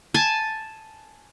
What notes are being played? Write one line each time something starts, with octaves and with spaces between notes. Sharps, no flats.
G#5 A5